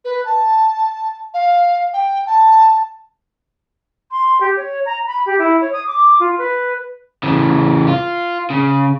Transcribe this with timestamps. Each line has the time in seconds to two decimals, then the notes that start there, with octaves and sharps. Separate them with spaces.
0.05 B4
0.25 A5
1.34 F5
1.94 G5
2.26 A5
4.11 C6
4.41 G4
4.57 C#5
4.86 A#5
5.07 B5
5.26 G4
5.39 E4
5.61 C#5
5.73 D#6
5.87 D6
6.20 F4
6.38 B4
7.23 C#3 E3
7.88 F4
8.50 C#3